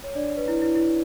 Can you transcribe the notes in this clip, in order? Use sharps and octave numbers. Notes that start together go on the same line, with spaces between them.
C#5
D4 D5
B4
E4
E4
E4